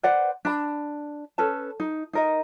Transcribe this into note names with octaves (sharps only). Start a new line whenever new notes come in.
B4 C5 D5 F#5
D4 B5
C#4 A4 B4 A5
D#4
D#4 A#4 D#5